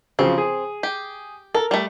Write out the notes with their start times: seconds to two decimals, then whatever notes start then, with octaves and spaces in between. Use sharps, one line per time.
0.19 C#3 F3 F#3 C4
0.38 G#4
0.83 G4
1.55 A4 A#4
1.71 G3 A3